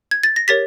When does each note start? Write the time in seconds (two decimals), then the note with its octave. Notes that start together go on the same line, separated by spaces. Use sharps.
0.11 G#6
0.23 A6
0.36 A#6
0.48 G4 A#4 C#5 A6 B6